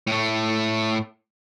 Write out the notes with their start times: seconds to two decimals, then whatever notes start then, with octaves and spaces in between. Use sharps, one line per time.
0.07 A2 A3